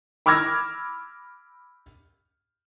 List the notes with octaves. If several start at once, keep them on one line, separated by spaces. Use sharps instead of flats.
B5 D6 E6 F6 G#6 A#6